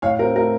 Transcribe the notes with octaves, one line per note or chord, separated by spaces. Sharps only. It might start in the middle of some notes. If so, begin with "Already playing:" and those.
A2 C#5 F5
C4 A#4
A3 A#4